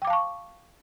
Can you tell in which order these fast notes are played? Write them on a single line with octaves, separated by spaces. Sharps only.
G5 D6 F5 A5 C#6